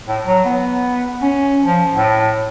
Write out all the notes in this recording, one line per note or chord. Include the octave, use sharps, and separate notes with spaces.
A2
F#3
B3
C#4
F3
A2